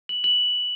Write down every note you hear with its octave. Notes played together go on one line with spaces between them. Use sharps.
F#7
F#7